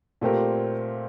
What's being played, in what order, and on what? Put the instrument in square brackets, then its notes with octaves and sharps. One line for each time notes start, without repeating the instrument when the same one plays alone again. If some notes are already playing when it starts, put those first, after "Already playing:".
[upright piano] A#2 A3 C4 G4 A#4